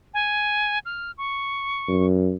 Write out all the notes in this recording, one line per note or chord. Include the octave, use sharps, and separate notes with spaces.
G#5
F6
C#6
F#2